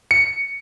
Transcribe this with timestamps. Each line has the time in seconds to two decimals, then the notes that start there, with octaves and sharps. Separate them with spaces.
0.11 C#7